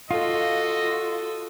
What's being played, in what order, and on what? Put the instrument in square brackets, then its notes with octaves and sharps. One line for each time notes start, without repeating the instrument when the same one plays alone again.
[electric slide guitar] F4 [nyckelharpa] F#4 A4 [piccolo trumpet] D#5